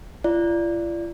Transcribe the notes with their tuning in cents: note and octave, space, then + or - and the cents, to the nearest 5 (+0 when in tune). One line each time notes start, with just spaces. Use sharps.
F4 -45 D5 -5